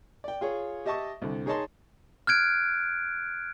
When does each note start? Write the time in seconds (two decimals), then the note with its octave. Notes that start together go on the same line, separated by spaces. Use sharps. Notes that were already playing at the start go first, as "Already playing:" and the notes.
0.24 D5 G5
0.41 F4 G#4 C#5
0.86 G4 D#5 E5 A5 C#6 D#6
1.22 C2 D3
1.46 D#4 G#4 C#5 D#5 A5 C6
2.27 F6 F#6 G#6 D7